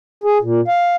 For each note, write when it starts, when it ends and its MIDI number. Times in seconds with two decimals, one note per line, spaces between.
0.24 0.38 68
0.42 0.61 46
0.68 0.96 77